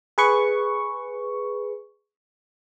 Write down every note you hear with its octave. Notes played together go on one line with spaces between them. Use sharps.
G#4 B4 C#6